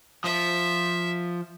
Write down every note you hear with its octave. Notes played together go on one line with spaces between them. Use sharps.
F3 E5